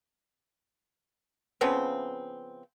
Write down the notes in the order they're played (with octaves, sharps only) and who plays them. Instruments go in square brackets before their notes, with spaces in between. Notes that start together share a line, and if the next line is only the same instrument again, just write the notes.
[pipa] C#3 F3 B3 C4